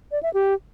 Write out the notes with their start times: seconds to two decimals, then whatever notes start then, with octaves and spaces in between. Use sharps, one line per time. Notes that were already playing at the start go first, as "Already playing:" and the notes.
0.12 D5
0.23 E5
0.34 G4